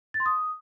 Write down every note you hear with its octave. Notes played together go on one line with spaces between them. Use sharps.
A6
C6
D#6